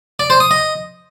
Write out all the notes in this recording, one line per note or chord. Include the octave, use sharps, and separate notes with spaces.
D5
C5
D#6
D#5